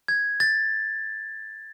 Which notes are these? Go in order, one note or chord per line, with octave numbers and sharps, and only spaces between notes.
G#6
A6